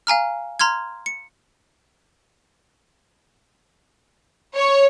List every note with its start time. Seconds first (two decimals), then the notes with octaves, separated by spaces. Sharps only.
0.07 F5 G#5 A#5 F6
0.59 A#5 C6 F6 G#6
1.06 C#7
4.53 C#5